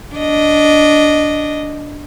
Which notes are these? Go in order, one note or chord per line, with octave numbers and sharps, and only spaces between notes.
D4 D#5